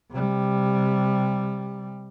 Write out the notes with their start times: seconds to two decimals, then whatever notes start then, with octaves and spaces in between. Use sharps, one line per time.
0.11 C3 G3